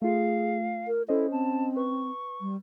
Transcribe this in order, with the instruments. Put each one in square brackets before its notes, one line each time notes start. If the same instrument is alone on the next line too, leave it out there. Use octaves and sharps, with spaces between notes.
[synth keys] A3 F4 [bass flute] G#4 [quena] F5
[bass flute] A#4
[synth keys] C#4 C5 D#5 [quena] E4 [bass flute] A4
[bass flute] C4 [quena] A5
[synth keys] B4 [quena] C#6
[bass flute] G3